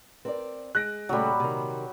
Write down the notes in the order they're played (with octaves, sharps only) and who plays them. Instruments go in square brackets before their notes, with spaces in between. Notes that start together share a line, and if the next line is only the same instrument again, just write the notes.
[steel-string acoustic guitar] C4 D5 [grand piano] A#4 B4
[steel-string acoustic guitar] G#3 [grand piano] F#6 A#6 D7
[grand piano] A#2 [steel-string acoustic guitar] C#3 A3 [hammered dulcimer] F#3 G3
[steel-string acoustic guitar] C3 D#3